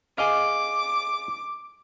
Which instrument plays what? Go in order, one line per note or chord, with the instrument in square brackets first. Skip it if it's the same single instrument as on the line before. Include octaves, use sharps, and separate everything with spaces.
[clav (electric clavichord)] G#4 D#5 F5 [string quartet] D6